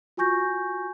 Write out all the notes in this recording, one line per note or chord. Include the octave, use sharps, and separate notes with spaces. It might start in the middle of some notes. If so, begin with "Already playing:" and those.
F4 F#4 G#5 C#6 G6 A#6